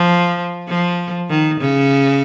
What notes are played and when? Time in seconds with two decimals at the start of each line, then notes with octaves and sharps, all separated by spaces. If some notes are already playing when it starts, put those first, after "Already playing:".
Already playing: F3
0.69 F3
1.30 D#3
1.61 C#3